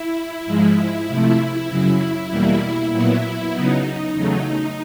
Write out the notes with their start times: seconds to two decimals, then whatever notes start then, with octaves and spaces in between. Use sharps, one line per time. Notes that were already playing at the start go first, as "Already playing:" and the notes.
Already playing: E4
0.46 G#2 F3 G#3
1.07 C3 F3 A3 E4
1.69 F#2 C#3 F#3
2.30 E2 B2 G3 A#3 E4
2.91 A#2 F#3 B3
3.52 C#3 F#3 B3 D#4
4.14 E2 C#3 F#3 A3